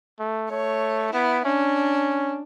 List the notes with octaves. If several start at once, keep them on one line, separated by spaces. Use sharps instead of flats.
A3
A3 C#5
B3 E4
C#4 D4